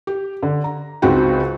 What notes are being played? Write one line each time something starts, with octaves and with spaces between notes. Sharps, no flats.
G4
D3
A#5
C#2 C4 D#4 F#4 G5